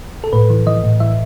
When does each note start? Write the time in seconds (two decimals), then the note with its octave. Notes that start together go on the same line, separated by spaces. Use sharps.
0.24 A4
0.33 A2 B4
0.50 E3
0.66 E3 D#5
0.83 A2
1.00 E3 E5